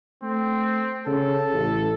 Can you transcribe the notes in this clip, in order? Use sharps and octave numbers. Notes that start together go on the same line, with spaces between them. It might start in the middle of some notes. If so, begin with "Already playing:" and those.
A3 C4
C#3 A4
A1